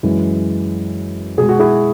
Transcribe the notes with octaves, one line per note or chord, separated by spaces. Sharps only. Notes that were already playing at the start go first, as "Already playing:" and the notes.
F#2 E3 G#3
B2 G#3 G#4
F#4
E4 G#4